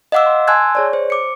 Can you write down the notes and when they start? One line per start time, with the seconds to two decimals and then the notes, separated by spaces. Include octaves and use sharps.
0.12 D#5 F5 F#5 D6 E6
0.26 C6
0.48 G#5 A5 C6 E6 F#6 G#6
0.75 G#4 C#5 D5
0.93 C5
1.10 D6 C#7